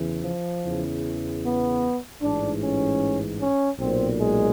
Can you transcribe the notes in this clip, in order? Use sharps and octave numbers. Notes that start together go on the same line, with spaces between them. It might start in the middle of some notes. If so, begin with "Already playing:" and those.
Already playing: E2 C#3 E3
F3
E2 C#3 E3
B3
A1 G#2 E3 D4
C#4
C#4
B1 A#2 C4
G#3